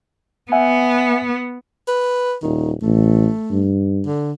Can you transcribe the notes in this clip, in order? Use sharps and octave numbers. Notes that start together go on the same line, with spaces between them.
B3 E5 F#5 G#5
B4
D#1 D#3
A1 A3
G2
D3